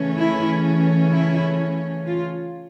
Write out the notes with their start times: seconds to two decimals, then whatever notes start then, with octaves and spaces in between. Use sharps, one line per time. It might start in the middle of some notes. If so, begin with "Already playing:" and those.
Already playing: C#3 E3 A3 C#4
0.17 E4
1.11 E4
2.06 F4